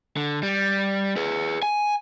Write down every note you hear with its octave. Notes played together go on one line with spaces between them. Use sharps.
D3
G3
G#4 B4
G#5